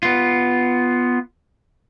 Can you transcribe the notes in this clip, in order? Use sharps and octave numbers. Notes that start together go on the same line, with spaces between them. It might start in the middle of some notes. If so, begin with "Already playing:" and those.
B3 F4